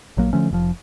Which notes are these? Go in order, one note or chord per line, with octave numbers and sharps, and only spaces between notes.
A#1 F#3 A#3
D3 F3 A3 C#4
F1 A2 F3